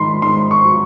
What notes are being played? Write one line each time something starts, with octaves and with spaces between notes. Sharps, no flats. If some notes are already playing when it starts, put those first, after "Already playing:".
Already playing: G#2 D#3 B5 C6
G#2 C6
C#6
F#3